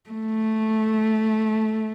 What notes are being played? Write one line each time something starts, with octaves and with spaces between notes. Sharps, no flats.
A3